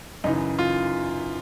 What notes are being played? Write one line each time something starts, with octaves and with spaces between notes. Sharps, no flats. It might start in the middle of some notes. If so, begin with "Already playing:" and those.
F#2 C#3 E3 D#4
F4